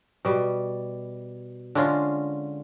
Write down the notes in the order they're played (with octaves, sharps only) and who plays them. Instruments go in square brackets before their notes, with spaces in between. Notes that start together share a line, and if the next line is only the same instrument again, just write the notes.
[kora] B2 G3
D3 G#3 C#4 F4